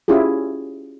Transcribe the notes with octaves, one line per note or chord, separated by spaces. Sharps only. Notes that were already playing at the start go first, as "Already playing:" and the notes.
C#4 E4 F4 G4 G#4